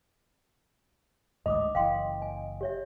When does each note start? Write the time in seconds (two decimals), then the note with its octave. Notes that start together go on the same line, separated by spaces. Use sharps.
1.46 A1 D2 G#2 D#5 B5 D6 D#6
1.75 F#1 E3 F5 G5 C6
2.22 G#5
2.61 G4 C#5 E5